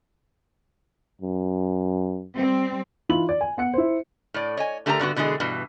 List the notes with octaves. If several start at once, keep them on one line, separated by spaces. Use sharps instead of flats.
F#2
G3 C4
E3 D#4 F4 B5 F#7
D5
G#5
B3 F#5 C#7
E4 C5
A2 D5
C#5 D#5 G#5
D3 A3 G4 A#4 A5 A#5
G2 D3 B3 F#4
B2 D3 E3 G#3 G#4
G2 B2 E3